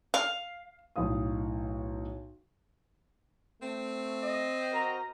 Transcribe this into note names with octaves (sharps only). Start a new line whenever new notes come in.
F5
B1 A2 F5 D#6
A3 C4
D#5
F#4 A#4 C5 A#5